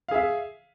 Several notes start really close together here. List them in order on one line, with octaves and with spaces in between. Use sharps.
F5 G#4 E5